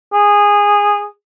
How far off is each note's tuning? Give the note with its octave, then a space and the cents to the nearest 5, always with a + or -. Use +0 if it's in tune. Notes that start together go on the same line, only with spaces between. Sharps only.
G#4 -15